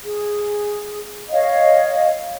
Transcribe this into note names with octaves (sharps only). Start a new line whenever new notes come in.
G#4
C#5 D#5 F5